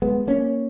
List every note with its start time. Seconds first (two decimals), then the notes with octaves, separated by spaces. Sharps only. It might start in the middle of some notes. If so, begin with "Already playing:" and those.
0.02 G#3 B3
0.27 A#3 C#4